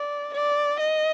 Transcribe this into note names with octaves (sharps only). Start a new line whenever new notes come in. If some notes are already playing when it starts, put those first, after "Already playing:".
Already playing: D5
D5
D#5